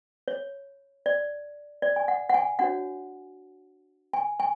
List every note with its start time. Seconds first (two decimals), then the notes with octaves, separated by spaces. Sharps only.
0.28 C#5
1.06 D5
1.82 D5
1.96 G#5
2.08 F#5
2.29 F#5
2.34 G#5
2.59 D4 F#4 C#5 F#5
4.13 G#5
4.40 G#5